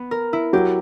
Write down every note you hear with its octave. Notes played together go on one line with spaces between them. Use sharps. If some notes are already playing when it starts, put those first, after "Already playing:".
Already playing: B3
A#4
E4
F#3 G4